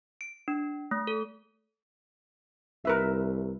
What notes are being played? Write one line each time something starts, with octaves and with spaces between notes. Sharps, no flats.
D7
D4
A3
A4
C2 A#4 B4 E5